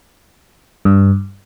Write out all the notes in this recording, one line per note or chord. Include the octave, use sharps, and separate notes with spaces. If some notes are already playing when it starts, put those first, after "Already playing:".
G2